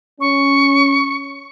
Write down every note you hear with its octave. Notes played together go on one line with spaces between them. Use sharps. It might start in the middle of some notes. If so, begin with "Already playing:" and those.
C#4 C#6